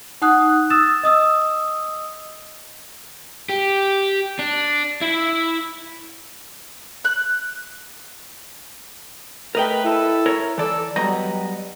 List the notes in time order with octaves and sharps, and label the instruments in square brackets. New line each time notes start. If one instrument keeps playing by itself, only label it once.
[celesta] D#4 F#5 D#6 F#6
D#6 E6 A6 E7
D#5 D#6 E6
[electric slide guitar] G4
D4
E4
[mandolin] F#6
[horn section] A3 B4 [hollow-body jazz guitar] A#4 D#5 G5
[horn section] E4 A4
[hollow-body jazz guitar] A#4 C#5 A#5
[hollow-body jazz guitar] E3 D5 [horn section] A4
[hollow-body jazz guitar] F#3 D#5 A#5 [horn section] G3 B3